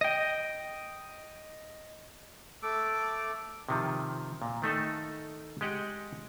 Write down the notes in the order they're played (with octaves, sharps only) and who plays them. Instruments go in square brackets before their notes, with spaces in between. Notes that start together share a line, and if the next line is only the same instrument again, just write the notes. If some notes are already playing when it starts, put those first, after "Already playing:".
[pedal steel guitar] D#5 G5
[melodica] A3 A4 D6
[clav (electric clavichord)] C3 D#3 F3
A#2
D#3 A3 D#4 A4
G#3 G4 D#5 F#5 G5